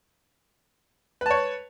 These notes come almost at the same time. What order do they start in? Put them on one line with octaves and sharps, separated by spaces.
B4 A5 C#5